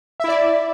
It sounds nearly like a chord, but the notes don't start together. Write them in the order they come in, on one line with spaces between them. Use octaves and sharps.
E5 E4 D5